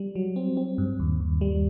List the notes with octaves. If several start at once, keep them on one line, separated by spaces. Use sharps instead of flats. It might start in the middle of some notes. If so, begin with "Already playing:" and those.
Already playing: G3
F#3
C4
C4
G2
D#2
D#2
G3